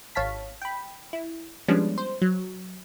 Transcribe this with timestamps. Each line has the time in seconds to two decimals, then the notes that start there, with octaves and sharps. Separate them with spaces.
0.15 G#1 C#5 F5 A5 B6
0.62 G5 B5
1.13 E4
1.68 F3 G3 G#3 B3 C#4 D4
1.98 C5
2.22 F#3